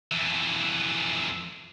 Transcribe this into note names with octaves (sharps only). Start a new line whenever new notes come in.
F2 E3